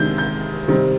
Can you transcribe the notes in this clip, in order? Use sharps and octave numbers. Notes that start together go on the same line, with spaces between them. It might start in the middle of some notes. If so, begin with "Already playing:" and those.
Already playing: C3 D#3 G#3 D4 G6
G6
C3 D#3 G3 C4